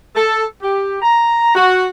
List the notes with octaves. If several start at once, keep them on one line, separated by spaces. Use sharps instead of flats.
A4
G4
A#5
F#4